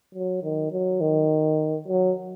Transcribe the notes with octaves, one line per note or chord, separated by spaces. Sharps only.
F#3
D#3
F#3
D#3
F#3